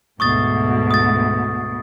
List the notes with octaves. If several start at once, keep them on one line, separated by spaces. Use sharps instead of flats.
D2 G#2 B2 C#6 D#6 A6
D#6 A6